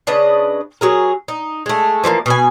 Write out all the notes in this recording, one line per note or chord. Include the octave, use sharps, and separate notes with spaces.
C#3 D4 B4 D#5
F#3 G#4 A#4
D#4
G#3 A3
E3 F3 G3 A#3
B2 B4 G#5